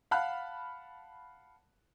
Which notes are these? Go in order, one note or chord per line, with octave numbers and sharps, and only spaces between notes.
F5 F#5 A5 B5 F6 F#6